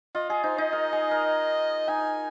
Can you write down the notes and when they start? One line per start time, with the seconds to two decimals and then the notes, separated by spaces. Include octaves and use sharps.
0.15 F4 D#5
0.29 G#4 D#5
0.43 D#4 C5
0.58 D#4 D#5
0.73 A#4
0.93 G#4
1.11 A#4
1.88 D#4 G#5